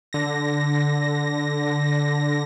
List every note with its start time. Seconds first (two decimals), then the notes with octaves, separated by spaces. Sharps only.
0.13 D3 A#6